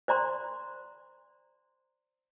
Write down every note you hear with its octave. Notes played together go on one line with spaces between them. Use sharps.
C5 D5 A#5 C6